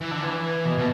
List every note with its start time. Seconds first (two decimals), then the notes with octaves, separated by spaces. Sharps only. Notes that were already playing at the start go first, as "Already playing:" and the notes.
0.01 E3
0.11 D3
0.22 E3
0.65 B2
0.78 B2